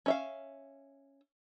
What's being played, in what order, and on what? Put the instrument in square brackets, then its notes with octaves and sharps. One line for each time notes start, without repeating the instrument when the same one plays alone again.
[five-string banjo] C#4 E5 F5